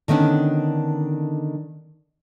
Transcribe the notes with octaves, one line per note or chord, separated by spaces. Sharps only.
D3 D#3 B3 C#4 D4